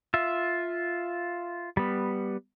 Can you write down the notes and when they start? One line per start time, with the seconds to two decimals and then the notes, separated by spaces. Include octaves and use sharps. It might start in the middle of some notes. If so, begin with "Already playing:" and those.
0.14 F4 E5
1.77 G3 B3